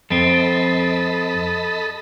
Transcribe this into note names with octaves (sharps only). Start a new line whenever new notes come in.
F2 C4 A4 D#5 B5